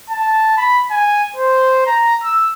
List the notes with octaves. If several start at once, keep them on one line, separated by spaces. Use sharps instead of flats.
A5
B5
G#5
C5
A#5
E6